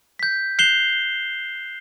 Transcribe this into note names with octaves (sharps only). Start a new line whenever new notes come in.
G6 B6
F#6 G6 C7 E7 F7 G7